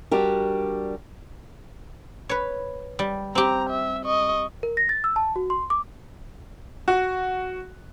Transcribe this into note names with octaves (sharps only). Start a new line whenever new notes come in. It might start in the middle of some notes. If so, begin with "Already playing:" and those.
G3 D4 F#4 G4 A#4
B4 C#5
G3
C4 G4 A#5
E5
D#5 C#6
A#4
A#6
A6
E6
A5
F#4
C6
D6
F#4